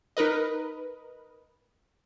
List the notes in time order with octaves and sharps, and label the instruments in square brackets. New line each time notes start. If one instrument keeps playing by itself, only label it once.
[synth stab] D#4 A#4 B4 D#5